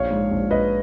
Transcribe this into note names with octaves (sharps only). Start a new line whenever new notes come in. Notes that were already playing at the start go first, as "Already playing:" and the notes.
Already playing: A#1 C#5 F5
G#2
A#1
A#1 B4 D#5